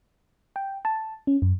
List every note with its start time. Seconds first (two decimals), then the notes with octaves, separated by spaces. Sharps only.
0.56 G5
0.85 A5
1.27 C#4
1.42 F#2